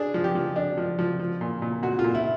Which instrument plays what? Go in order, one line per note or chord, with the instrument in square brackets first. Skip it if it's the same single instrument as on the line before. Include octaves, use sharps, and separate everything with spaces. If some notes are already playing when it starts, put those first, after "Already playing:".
Already playing: [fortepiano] D4 G#4
F3
G4
F3
D4
F3
F3
F3
A#2
A#2
A#2 F#4
F4
A#2
E4